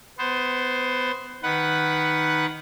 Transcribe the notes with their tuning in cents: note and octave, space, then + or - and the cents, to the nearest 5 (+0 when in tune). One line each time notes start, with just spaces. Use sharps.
B3 +20 C5 +0
D#3 +0 B4 +0 F#5 +5